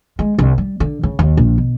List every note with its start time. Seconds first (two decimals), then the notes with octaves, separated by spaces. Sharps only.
0.19 G#3
0.38 C2
0.58 G3
0.80 D3
1.03 C#3
1.19 D#2
1.37 A#1
1.58 B2